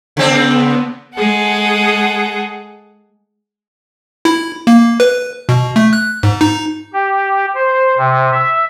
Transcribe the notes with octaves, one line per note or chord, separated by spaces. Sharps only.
C#3 B3 C4 D4
G#3 G#4 A4 F#5
E4
A#3
B4
B2
A3
F#6
G#2
D#4
G4
C5
C3
E5